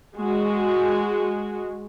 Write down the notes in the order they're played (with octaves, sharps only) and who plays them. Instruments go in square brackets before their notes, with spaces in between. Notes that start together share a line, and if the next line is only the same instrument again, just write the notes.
[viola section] G#3 F#4